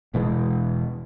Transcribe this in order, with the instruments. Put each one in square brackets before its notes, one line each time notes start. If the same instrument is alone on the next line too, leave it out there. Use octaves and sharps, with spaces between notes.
[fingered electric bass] E1 B2 E3 G#3